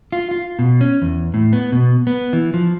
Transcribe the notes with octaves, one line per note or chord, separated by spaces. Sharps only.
F4
F4
B2
C#4
E2
A2
B3
B2
B3
E3
F3